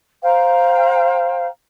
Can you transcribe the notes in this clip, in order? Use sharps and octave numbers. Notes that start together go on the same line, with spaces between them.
C5 F5 G5 A#5